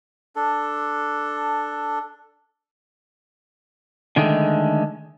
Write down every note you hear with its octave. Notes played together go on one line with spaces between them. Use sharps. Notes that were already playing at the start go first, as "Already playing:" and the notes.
D4 A4
D3 D#3 G#3 A3